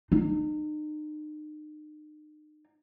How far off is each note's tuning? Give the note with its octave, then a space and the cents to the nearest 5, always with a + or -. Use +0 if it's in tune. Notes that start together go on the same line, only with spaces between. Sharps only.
D#4 -40